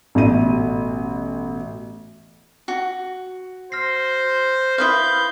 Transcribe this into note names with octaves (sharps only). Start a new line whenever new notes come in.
A1 B2 E5 D#7
F#4
C5 F6 A#6 C7
E4 B4 F5 C6 D#6 G6